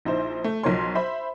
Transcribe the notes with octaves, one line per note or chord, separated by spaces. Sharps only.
A#1 D#4 E4 C5
A3
B1 F3 A#4 C#5 C6
C5 E5 B5